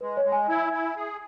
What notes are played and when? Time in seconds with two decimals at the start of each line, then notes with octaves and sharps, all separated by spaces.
0.01 G#3 B4
0.17 C#5
0.25 G#3
0.32 G#5
0.49 E4
0.73 E4
0.97 G#4